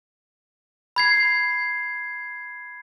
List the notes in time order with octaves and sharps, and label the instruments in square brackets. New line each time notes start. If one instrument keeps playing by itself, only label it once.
[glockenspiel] B5 G#6 C7